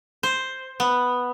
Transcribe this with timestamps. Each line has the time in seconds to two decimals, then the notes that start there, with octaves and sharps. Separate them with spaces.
0.23 C5
0.80 B3